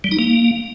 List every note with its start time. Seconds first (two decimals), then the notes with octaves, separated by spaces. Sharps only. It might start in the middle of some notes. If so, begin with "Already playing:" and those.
0.04 G3
0.11 D#4
0.19 A#3